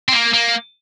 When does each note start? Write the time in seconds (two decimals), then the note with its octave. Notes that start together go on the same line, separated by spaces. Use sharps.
0.09 C4
0.13 A#3
0.34 A#3